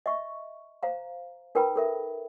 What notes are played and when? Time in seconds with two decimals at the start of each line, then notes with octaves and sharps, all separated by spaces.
0.06 D#5 E5 C#6
0.83 C5 F5 A#5
1.55 D#4 A#4 B4 G5 A#5 B5
1.76 A4 A#4 E5